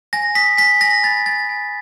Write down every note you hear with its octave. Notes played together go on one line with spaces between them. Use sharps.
G#5 A#6
D#6 B6
G#5 B6
G#5 A#6
B5 A6
G#5 A6
G#5